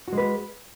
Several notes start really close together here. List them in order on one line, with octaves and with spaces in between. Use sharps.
F#4 G#3 B4